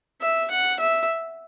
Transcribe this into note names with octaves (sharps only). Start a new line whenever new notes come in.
E5
F#5
E5